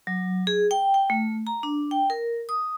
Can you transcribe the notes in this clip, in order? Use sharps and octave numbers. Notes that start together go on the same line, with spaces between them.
F#3
G#4
G5
G5
A3
A#5
D4
G5
A#4
D#6